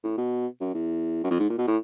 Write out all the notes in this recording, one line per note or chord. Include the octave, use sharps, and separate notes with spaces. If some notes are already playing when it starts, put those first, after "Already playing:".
A2
B2
F#2
E2
F#2
F2
G#2
A#2
B2
A2